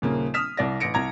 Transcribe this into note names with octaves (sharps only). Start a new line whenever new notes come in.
D#1 C#3 A#3
D#6 F6 B6 E7
C2 D5 A#6
A1 A#6 C#7 D7
C2 A#5 G#6